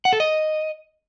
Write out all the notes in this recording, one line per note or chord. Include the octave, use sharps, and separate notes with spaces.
F#5
A4
D#5